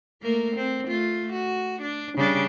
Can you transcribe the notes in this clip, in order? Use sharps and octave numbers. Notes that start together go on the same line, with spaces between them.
A3 A#3 A#4
C4
A3 F4
F#4
D4
C#3 G3 D4